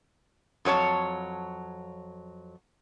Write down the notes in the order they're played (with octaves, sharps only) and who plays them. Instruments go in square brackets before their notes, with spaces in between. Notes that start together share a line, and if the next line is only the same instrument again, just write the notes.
[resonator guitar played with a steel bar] F2 F#3 C#5 A5